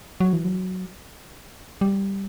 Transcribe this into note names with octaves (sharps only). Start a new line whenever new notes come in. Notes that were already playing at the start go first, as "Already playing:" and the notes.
F#3
E3
F#3
G3